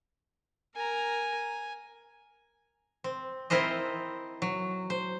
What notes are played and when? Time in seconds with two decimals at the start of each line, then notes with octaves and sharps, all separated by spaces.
0.76 A#4 G#5 A#5
3.04 C4
3.50 C4 E4 A#4 C5 D#5
4.42 F#3
4.90 C5